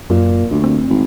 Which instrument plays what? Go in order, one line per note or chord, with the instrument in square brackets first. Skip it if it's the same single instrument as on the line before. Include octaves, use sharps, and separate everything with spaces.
[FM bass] F#2 [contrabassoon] A#2
[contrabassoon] D2
[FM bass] C4
[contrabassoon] G#1